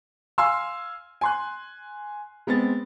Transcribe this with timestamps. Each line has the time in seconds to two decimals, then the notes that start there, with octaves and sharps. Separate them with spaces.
0.38 F5 G#5 C6 E6
1.21 G#5 C6 F#6
2.47 G#3 B3 C4 A6